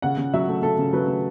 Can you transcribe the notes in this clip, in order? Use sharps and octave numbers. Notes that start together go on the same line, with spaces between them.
C#3 F#5
C#3
F#3 E5
A3
C#3 A4
C#3
F#3 B4
A3